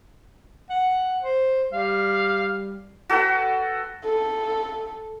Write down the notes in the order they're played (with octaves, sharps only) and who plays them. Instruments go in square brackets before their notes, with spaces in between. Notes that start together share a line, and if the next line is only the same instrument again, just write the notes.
[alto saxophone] F#5
C5
[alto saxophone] G3 [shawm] F5
[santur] F#4 A4 B4 G5
[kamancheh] A4